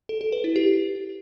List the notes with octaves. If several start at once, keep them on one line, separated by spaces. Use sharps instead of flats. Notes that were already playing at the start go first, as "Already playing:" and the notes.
A4
A4
B4
E4
G4